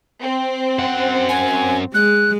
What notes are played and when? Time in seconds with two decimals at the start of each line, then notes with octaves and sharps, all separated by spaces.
0.21 C4
0.79 F#2 F#5
1.29 G#5
1.94 G#3 F#6